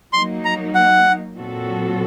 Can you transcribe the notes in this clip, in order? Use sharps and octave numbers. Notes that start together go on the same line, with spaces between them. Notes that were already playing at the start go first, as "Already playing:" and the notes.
F#3 A#3 D#4 C6
A#5
F#5
A#2 F#3 C4 F#4 A4